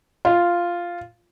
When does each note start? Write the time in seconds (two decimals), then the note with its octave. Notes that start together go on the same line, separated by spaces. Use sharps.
0.25 F4